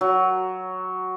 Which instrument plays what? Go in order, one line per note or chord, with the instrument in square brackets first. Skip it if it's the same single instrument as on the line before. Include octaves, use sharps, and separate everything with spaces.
[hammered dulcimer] F#3